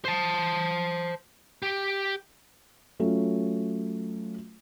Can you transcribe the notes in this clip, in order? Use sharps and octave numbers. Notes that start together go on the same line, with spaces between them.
C5 A5
G4
F#3 A3 C#4 F4